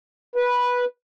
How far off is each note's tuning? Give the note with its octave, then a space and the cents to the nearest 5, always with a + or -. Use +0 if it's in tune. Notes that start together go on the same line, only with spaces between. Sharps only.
B4 -10